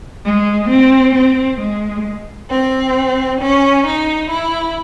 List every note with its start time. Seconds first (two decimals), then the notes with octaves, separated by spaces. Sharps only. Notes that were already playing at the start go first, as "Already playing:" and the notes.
0.25 G#3
0.70 C4
1.15 C4
1.60 G#3
2.50 C4
3.40 C#4
3.85 D#4
4.30 E4